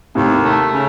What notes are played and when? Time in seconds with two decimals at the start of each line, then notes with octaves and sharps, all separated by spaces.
0.15 D#2 A2 C3
0.44 A3
0.71 C#3